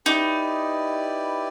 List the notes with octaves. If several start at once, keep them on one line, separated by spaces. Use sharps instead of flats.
D#4 E4 G4 B4 D5